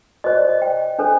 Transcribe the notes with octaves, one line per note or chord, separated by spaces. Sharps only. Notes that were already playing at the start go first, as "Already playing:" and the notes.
F#4 C5 D#5
D5
D#5
G5
D4 A4 C5